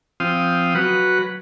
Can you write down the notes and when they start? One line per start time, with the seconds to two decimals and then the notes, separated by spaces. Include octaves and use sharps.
0.20 F3 C4 F5 G5 D#6
0.75 F#3 B4 F#5